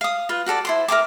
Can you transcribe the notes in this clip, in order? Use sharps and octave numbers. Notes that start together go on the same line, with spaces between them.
F5 D#6
F4 B4
F#4 G4 A4 D5
E4 C5 C6
A#4 E5 G5 D6